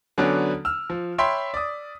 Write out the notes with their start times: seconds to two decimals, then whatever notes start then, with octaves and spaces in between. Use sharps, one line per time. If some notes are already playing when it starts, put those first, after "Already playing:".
0.18 D3 F#3 B3 C#4 D4
0.65 E6 F6
0.90 F3
1.18 C#5 E5 G5 B5 C6 B6
1.54 D5 D#6